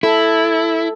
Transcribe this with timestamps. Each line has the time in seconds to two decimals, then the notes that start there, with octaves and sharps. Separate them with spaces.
0.03 E4 A4